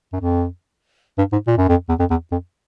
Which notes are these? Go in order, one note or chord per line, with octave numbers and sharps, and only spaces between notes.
F#2
F2
G2
G#2
A#2
F#2
F2
E2
F2
E2
F2